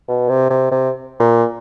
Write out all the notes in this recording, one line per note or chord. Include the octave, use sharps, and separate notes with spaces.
B2
C3
C3
C3
A#2